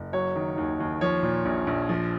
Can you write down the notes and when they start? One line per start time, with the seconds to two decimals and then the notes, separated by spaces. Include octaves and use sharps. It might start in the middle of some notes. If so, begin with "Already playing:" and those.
Already playing: F#1
0.13 F#3 C#5
0.36 D#3
0.58 D#2
0.80 D#2
1.01 F3 C#5
1.23 A#2
1.45 A#1
1.67 A#1
1.89 F3